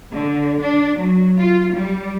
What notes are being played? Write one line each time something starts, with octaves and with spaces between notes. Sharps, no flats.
D3
D4
F#3
F4
G3